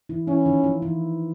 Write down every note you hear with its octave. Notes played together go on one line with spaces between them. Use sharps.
E3 E4
E3 C#4 E4
D#3 D#4
F3 F4
E3 E4